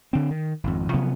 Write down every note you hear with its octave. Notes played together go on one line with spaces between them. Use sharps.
D3 C4
D#3
G#1 F2
C3 F3 F#3 B3